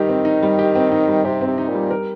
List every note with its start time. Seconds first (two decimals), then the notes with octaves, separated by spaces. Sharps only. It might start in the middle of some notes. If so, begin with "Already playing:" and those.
Already playing: D#3 G3 D#4 G4
0.09 C4
0.25 D#4
0.43 G3
0.59 G4
0.75 C4
0.92 D#4
1.08 G3
1.25 C3 G4
1.41 C4
1.47 C3
1.58 D#4
1.69 A#2
1.74 G3
1.91 A#4